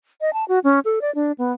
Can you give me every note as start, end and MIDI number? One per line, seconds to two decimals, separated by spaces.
0.21 0.33 75
0.33 0.44 81
0.48 0.59 66
0.64 0.80 61
0.85 0.99 69
1.01 1.13 74
1.15 1.32 62
1.38 1.52 59